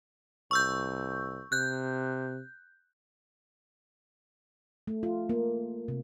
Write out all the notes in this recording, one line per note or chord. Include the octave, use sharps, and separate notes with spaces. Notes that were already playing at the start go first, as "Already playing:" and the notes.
C2 C#6 E6 G6
C3 F#6 G6
A3
F4
A#3
C3